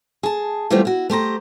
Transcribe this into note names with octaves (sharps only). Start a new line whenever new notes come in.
G#4 A5
E3 G3 A3 B3 C4 F4
E4 F#4
A3 G4 C5 A#5